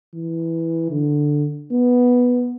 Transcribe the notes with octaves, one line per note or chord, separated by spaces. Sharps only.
E3
D3
B3